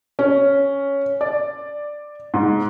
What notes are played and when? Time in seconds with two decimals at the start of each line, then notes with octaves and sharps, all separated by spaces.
0.19 C#4
1.21 D5
2.34 G#2